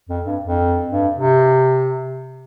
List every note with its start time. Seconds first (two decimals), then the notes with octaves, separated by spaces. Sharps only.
0.09 F2
0.26 G2
0.42 F2
0.90 G2
1.14 C3